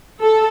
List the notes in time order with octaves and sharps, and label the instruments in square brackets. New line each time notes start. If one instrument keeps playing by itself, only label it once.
[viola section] A4